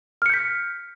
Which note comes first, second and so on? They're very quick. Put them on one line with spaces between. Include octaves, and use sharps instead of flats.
F6 C#7 G6 B6